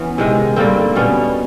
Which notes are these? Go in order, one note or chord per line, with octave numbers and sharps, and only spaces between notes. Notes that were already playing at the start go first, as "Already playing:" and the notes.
Already playing: E3 B3 C#4
C3 D#3 G#3
G2 D3 G3 A#3 C4
B2 G3 B3 C#4